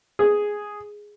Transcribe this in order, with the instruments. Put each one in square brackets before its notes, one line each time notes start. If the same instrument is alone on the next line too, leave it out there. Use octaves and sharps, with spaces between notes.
[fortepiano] G#4